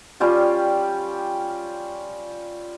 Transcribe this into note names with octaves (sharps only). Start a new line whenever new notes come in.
G3 C#4 F4 G4